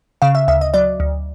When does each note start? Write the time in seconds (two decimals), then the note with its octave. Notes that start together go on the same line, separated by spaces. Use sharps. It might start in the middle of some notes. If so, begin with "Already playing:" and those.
0.22 C#3 F5
0.35 E5
0.48 D2 E5
0.61 D#5
0.74 F#3 D5
1.00 D2